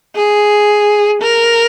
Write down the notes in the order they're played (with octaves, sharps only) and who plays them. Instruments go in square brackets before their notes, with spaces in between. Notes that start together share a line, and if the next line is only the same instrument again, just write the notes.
[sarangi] G#4
A#4